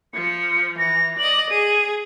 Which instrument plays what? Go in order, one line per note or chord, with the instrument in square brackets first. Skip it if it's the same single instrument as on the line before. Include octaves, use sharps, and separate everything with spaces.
[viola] F3 [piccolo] C#7
[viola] E3 [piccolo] A#6
[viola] D5 D#5 [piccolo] F#7
[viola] G#4 [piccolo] D#7